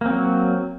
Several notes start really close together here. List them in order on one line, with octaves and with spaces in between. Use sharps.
A#3 C4 F#3